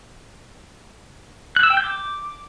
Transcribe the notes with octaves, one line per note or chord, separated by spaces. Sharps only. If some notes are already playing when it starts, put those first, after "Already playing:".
F#6
E6
G5
G6
D6